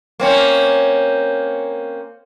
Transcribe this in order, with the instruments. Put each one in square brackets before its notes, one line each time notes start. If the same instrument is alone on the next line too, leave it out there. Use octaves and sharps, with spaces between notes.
[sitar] A#3 C4 C#4